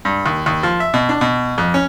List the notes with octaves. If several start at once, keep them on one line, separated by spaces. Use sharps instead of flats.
G2
D#2
D#2
F3
E5
B2
D4
B2
F2
C#4